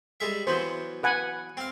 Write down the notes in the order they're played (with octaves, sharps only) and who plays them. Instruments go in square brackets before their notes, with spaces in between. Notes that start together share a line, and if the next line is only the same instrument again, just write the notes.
[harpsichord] G3 G#3 E5
[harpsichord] E3 F#3 B3 [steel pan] C5
[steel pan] B4 F#5 G#5
[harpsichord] C4 F5